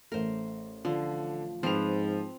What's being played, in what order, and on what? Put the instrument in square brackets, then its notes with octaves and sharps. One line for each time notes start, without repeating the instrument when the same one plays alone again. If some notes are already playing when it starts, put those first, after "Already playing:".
[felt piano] A1 A3 [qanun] A#4 C5
[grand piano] D3 [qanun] F3
[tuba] G#2 [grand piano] F3 F7 [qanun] C4 B4